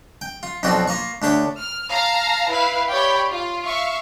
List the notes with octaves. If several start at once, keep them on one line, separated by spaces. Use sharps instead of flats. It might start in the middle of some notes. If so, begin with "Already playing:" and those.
G5
F4
B1 F2 C4 F4 F#4 D5
A#3 F4 C#6
D2 D4 G4 C#5
F6
F5 A5 A#5 F6
E4 B4 F5
G4 C#5 D5 G5 B5
F4
E5 F5 C#6